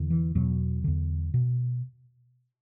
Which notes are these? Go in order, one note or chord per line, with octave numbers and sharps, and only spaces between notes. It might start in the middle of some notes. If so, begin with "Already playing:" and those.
Already playing: E2 D3
E3
E2 B2 F#3
E2 D3
B2